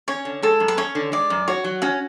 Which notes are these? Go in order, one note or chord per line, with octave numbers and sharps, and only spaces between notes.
C#4 C#5
D3
G#3 A4
F#2
B4
C#4 C#5
D3
G#3 D5
F#2
F#4 C#5
F#3
C#4 F#4